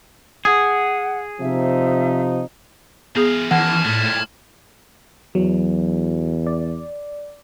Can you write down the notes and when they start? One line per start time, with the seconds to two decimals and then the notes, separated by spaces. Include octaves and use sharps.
0.45 G#4 F#5
1.41 C3 F3 D#4 E5
3.15 E3 B3 G#4 F5 D#6
3.51 F#2 E3 F#5 A5 F6 G#6
3.85 A2 G3 G#3
5.35 E2 F#3
6.47 D5